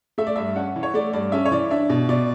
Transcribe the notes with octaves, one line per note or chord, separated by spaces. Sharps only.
A3 E5
D5
G2 E5
C#4 F#5
E3
C#5
A3 D5
G2 D5
C#4 E5
C#5
E3 D5
D4 E5
B2
B2 D5